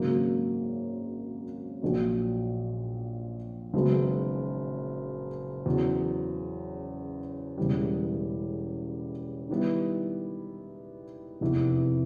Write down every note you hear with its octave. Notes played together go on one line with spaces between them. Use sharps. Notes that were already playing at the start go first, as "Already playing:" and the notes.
Already playing: G#1 F#2 C#3 F#3 A#3
A#1 A#2 F#3
F#1 F#2 D#3 G#3 B3
E2 C#3 F#3
E1 E2 C#3 E3 G3
D#3 G3 B3 E4
F1 E2 C3 E3